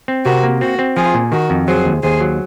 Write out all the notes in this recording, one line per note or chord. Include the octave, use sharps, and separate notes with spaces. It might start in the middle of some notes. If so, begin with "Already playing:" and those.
C4
C3 F#4 A#4
A#3
C4 F#4
C4
F3 F4 G#4
A#2
D#3 F#4 A#4
F2
F#3 G#4 C5
D#2
D#2 G#4 C5
F#3